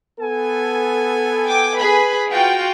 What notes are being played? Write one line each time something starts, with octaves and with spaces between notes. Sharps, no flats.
B3 A4 G#5
G5 D6
G#4 B4 B5
F4 F#4 G5